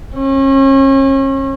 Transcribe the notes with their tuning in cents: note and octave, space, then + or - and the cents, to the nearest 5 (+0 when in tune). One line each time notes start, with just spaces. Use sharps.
C#4 -35